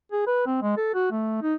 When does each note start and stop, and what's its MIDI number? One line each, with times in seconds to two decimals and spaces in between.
0.12 0.24 68
0.27 0.45 71
0.46 0.58 60
0.62 0.74 56
0.77 0.93 69
0.95 1.11 66
1.11 1.42 57
1.42 1.55 63